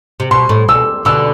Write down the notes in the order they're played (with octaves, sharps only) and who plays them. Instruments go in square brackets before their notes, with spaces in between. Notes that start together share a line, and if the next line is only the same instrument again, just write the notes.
[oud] C3
[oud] B2 [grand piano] C6
[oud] A2
[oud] B2 [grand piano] E6
[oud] B2 D3 [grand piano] E6